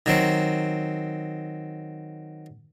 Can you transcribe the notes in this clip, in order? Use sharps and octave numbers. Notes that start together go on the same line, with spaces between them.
D#3 F#3 C4